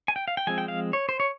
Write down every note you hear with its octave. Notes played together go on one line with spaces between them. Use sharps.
G#5
G5
F5
G5
F3 G#3 C4 G#5
G5
F5
C#5
C5
C#5